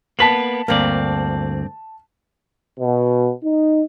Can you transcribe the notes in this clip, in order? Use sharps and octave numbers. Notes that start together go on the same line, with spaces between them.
A#3 B3 B4 A5 B6 F#7
D2 G2 A#3 C4 D5
B2
D#4